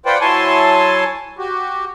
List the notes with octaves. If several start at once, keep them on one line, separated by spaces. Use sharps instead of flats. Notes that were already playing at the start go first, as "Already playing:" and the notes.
F4 B4 C5 D5 F#5 G5
F#3 E4 C#5 G#5 A5 C6
F#4 G4